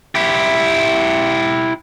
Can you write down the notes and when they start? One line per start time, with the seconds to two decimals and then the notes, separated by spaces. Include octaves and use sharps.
0.15 E4 G4